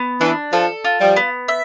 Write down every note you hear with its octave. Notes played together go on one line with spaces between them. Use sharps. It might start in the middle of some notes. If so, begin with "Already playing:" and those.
Already playing: B3
E3 D4
F3 A4
F4
F3 G3
B3
E5